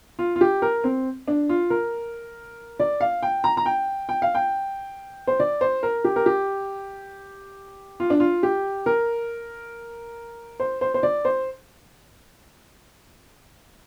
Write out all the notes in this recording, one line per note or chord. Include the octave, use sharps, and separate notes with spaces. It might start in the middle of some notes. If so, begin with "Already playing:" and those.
F4
F4
G4
A#4
C4
D4
F4
A#4
D5
F5
G5
A#5
A#5
G5
G5
F5
G5
C5
D5
C5
A#4
G4
A#4
G4
F4
D4
F4
G4
A#4
C5
C5
C5
D5
C5